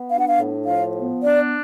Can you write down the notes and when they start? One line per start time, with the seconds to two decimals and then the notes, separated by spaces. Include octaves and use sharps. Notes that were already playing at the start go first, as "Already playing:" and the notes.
Already playing: B3
0.09 D4 F5
0.20 F#5
0.29 F5
0.38 A2
0.66 F3 F5
0.96 B3
1.24 D4 D5